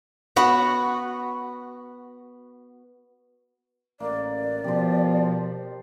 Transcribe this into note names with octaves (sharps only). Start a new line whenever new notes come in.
B3 F#4
A1 A#3 D5
B2 F3 G4 C5